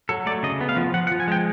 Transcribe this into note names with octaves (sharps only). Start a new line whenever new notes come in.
F#3 A4
A3 D5
C#3 D#5
B3
F5
F3
F3 F#5
F#5
F3
G#5
G#3 G5